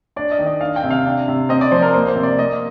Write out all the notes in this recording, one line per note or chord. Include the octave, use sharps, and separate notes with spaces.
D4 D5
D#5
D#3
D#5
D4 F5
G5
C3
F5
D4
C3
C4 D#5
D5
F3 C5
A#4
A#3 C5
C5
C3
D5
A#3 D#5